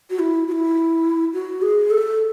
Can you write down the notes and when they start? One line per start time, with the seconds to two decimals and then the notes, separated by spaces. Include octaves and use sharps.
0.10 F#4
0.19 E4
0.48 F#4
0.52 E4
1.33 F#4
1.62 G#4
1.90 A4